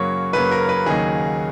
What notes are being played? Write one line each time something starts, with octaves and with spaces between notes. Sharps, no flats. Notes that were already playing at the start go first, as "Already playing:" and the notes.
Already playing: F#2 C#3 F#3 A#3 C#5
F#2 C#3 F#3 A#3 B4
A#4
B4
D#2 C#3 F#3 A#3 D#4 G#4